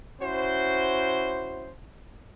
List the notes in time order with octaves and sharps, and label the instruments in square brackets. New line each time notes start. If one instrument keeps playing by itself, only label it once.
[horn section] C#4 E4 F#4 C5